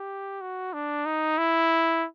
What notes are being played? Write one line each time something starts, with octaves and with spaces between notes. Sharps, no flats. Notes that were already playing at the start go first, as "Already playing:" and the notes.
Already playing: G4
F#4
D4
D#4
E4